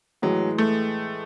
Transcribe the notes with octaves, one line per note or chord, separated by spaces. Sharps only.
A2 E3 F#3 G#3
A3